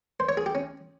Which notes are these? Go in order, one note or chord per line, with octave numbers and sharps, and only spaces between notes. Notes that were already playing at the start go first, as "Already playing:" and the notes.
C5
C#5
G#4
G4
C#4